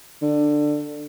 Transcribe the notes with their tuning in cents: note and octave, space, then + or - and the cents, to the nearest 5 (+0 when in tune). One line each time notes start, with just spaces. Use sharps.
D3 +15